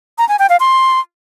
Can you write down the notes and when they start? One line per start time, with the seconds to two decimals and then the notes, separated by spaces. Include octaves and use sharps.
0.18 A#5
0.29 G#5
0.39 G5
0.50 F5
0.60 C6